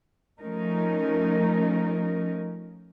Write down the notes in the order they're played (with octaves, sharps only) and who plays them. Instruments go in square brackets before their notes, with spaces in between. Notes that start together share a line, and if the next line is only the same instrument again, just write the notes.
[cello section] F3 A3 C#4 D#4 A#4